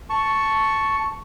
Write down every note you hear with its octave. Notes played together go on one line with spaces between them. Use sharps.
A5 C#6